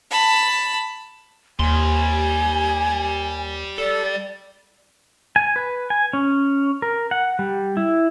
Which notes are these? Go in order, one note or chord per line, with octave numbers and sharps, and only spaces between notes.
A5 B5
D#2 G3 G#5 C6
A4 D5
G#5
B4
G#5
C#4
A#4
F#5
G3
E4